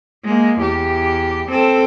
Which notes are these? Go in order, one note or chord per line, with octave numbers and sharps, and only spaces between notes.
G#3 A#3
E2 G4
C4 A4